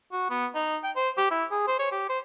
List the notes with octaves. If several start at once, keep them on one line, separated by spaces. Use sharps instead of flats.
F#4
B3
D#4
G5
C5
G4
E4
G#4
C5
C#5
G4
C5